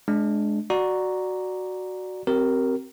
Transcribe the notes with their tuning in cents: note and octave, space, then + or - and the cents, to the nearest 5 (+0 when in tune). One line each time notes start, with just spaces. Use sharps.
G#3 +25 D4 +0
F#4 +0 D5 +10 A#5 +0
C4 +0 G4 -40 A#4 +0